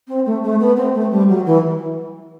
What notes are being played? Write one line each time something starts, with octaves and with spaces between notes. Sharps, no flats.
C4
A3
A3
B3
C4
A3
G3
F#3
E3